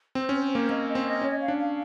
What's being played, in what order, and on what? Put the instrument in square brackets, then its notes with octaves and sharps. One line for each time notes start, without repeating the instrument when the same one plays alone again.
[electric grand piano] C4 [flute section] C5
[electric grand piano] C#4 [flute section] C5
[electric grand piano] A#3 [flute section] C5
[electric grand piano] A#3 [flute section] D#5
[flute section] D#5
[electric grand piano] C4
[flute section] D#5
[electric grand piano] C#4 [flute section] C#5
[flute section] F5
[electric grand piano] D4
[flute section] F5